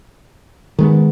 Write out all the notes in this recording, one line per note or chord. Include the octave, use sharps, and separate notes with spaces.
D#3 G#3 B3